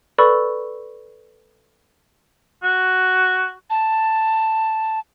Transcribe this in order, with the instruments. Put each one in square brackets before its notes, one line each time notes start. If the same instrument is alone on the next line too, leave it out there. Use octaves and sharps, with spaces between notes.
[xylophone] A4 B4 D5 B5 C#6 E6
[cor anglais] F#4
[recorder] A5